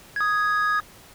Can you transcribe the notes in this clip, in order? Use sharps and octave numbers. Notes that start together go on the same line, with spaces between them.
D#6 G#6